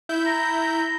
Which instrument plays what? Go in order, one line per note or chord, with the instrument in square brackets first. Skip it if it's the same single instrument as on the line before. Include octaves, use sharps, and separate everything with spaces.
[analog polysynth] E4 G6
[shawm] A#5